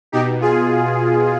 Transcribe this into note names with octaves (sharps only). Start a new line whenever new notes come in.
B2 D#4 G4
F4 G#4